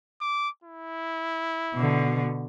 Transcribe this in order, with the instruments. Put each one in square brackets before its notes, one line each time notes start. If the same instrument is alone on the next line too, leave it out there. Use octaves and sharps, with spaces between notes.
[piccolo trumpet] D6
E4
[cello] B2 D3